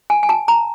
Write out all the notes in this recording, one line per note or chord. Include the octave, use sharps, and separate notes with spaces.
G#5
G#5
A5
A#5